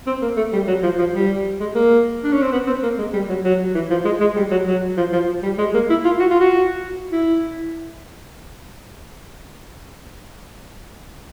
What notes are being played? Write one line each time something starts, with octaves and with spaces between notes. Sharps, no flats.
C4
A#3
A3
G3
F#3
F3
F3
G3
G#3
A#3
D4
C#4
C4
B3
C4
A#3
G#3
G3
F#3
F#3
E3
F3
G#3
G#3
G3
F#3
F#3
F3
F3
G3
G#3
A#3
E4
F4
F#4
F4
F#4
E4